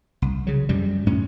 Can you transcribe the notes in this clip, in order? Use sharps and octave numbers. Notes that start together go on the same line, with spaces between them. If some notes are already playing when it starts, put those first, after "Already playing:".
C2
C#3 F#3
F#2 C3 G3
F#2 A2 C#4